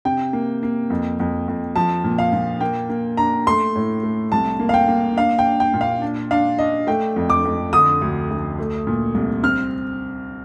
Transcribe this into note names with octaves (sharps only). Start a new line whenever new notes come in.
C3 G5
A#3
A#3
F2
F2
F2
F3 A5
A#2
F5
A#2
A#3 G5
A#3
D4 A#5
A3 C6
A2
A3
C2 A5
A#3
F5
G5
A#3
D4 F5
G5
D4
G5
A#2
F5
D4
D4 F5
D4 D#5
A3 G5
F2
D6
F2
D3 D#6
D2
D2
A3
A#2
C2
C4 F6